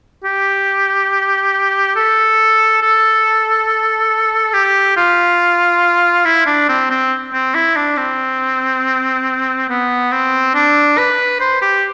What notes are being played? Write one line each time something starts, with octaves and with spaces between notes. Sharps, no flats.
G4
A4
A4
G4
F4
E4
D4
C4
C4
C4
E4
D4
C4
B3
C4
D4
B4
C5
G4